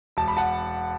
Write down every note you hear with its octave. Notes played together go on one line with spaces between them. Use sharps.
E1 A5
B5
F#5 A5